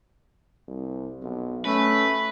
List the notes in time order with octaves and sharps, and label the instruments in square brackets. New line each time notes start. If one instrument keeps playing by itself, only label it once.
[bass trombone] C2
B1
[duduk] A3 [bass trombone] C#4 [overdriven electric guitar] B4